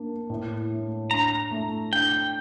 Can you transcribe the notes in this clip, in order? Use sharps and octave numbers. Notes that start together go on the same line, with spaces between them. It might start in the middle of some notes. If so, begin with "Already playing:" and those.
Already playing: A#3 D4
A2
A3
D4 A#5
A3
D4 G5